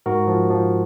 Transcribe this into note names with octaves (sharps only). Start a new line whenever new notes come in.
G#2 F#4 A#4
F3
F3